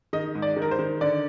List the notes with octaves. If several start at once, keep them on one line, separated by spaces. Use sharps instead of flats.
D#3 D#5
G#2
D5
D#3
A#4
C5
D#3
D3 D5